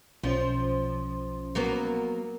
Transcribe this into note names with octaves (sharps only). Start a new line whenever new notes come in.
B1 F3 C#4 C5
F#3 A#3 B3